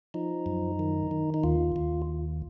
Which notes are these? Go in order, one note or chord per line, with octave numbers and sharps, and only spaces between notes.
F3 D#4
F#2
D#3
D#3
D#4
D#2 F4
D#2